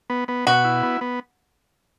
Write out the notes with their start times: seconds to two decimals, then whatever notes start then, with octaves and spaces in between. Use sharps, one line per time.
0.10 B3
0.28 B3
0.47 B2 F#4
0.64 E4
0.83 B3
1.01 B3